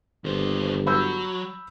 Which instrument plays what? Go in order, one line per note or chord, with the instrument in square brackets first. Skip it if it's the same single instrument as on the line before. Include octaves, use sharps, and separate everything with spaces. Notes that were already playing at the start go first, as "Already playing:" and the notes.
[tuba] G1 [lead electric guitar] D#2 C5
[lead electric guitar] F#3 [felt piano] B5 E6 G6